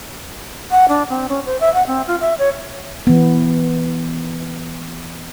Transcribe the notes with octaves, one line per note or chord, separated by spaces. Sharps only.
F#5
D4
C4
C#4
C5
E5
F#5
C4
F4
E5
C#5
E3 B3